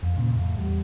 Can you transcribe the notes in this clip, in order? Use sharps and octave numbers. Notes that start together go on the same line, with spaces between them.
F2
A#2 C#3 A#3
F2 A2
E2 G3